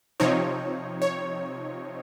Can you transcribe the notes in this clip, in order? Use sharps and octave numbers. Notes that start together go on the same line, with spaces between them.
C3 F3 C4 D#4 C#5
C#5